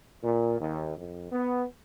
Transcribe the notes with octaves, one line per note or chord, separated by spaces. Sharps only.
A#2
D#2
F2
B3